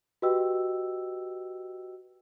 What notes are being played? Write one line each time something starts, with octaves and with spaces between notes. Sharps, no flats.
F#4 G4 B4 D#5 G5 E6